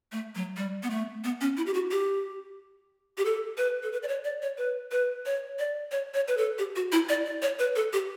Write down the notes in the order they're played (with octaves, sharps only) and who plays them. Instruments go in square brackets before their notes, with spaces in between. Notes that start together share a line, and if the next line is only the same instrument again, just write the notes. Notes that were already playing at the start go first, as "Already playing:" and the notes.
[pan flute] A3
F#3
G3
B3
A3
B3
C#4
E4
G4
F#4
G4
G4
A4
B4
A4
B4
D5
C#5
D5
C#5
B4
B4
C#5
D5
C#5
C#5
B4
A4
G4
F#4
E4
D5
D5
C#5
B4
A4
G4